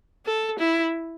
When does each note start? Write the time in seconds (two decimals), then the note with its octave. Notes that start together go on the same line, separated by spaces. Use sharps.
0.26 A4
0.59 E4